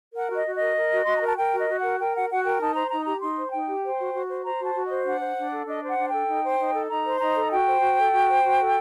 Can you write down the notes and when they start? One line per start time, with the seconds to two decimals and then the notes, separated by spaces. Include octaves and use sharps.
0.14 A#4 F#5
0.30 F#4
0.35 D#5
0.46 F#4
0.55 D#5
0.61 A#4
0.76 A#4
0.92 F#4
1.04 F#4 C6
1.15 A#5
1.22 A#4 A5
1.37 A#4 G5
1.53 F#4
1.59 D#5
1.68 F#4
1.78 F#5
1.84 A#4
1.99 A#4 G5
2.15 F#4 F#5
2.30 F#4 F#5
2.45 A#4 G5
2.60 D#4 A5
2.75 C5 A#5
2.90 D#4 A#5
3.06 G4 A#5
3.21 D#4 C6
3.37 C5
3.52 D#4 G5
3.68 G4
3.84 C5
3.99 F#4
4.14 F#4
4.28 C5
4.44 C5 A#5
4.60 F#4 A5
4.75 F#4
4.85 D#5
4.90 C5
5.05 D4 F#5
5.21 C5
5.37 D4
5.51 A4
5.67 D4 D#5
5.83 C5
5.88 F#5
5.98 D4
6.08 A4 G5
6.29 D#4
6.43 C5
6.59 D#4
6.74 A4
6.90 D#4 A#5
7.05 C5
7.21 D#4 A#5
7.36 A4
7.51 F#4 G5
7.66 C5
7.81 F#4
7.98 A4
8.13 F#4
8.28 C5
8.43 F#4
8.59 A4